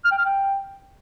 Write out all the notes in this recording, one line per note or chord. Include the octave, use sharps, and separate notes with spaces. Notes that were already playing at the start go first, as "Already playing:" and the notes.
F6
G5
F6
G5